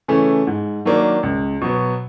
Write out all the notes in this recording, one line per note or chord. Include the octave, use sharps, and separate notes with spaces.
C#3 E3 A3 C#4
G#2
D#3 F#3 A#3 D4
C#2
B2 F#3 B3